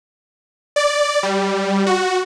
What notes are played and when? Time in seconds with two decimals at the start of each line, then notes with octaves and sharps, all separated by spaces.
0.76 D5
1.23 G3
1.86 F#4